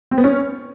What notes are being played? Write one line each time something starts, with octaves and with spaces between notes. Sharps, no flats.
C4
B3
C#4